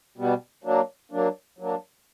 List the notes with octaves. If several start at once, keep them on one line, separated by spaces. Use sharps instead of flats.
B2 G3 B3
F#3 A#3 D4
F#3 A#3 D4
F#3 A#3 D4